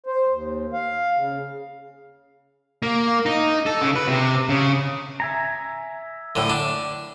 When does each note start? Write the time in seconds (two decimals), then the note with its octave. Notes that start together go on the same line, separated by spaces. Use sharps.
0.06 C5
0.29 D#2
0.73 F5
1.16 C#3
2.83 A#3
3.26 D#4
3.66 A4
3.81 C#3
3.96 B4
4.08 C3
4.49 C#3
5.20 E5 G#5 A#5
6.36 A2 D3
6.50 D4